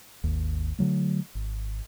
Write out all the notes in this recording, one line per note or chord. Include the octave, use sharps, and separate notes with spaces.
G#1 D#2
D3 F#3 A3
G#1